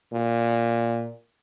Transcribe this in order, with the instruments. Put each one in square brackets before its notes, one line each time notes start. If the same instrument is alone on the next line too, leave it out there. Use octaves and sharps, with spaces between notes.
[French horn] A#2